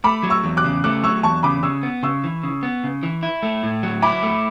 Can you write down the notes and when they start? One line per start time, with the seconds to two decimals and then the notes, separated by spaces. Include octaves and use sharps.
0.04 A3 B5 D6
0.23 F#3
0.30 C#6 E6
0.44 E2
0.57 D6 F#6
0.64 C#3
0.84 A3 D6 F#6
1.03 F#3 C#6 E6
1.23 E2 A5 C#6
1.43 C#3 B5 D6
1.63 C#3 C#6 E6
1.83 B3
2.03 C#3 C#6 E6
2.24 E3
2.43 C#3
2.63 B3
2.84 C#3
3.03 E3
3.23 E4
3.43 A3
3.63 A2
3.83 F#3
4.02 E4 B5 D6
4.23 A3